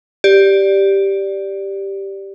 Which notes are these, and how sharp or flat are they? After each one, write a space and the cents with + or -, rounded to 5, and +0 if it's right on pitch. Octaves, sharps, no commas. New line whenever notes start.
G4 +0 D5 +0